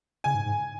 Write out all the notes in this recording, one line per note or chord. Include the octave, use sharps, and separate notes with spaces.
C#3 G#5
G#2
G#2